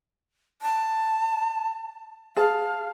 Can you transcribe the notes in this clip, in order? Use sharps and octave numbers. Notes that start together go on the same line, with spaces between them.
A5
G#4 F5 A5